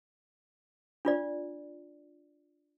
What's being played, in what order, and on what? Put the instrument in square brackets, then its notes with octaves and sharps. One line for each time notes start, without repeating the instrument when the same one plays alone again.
[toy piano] D4 F4 D5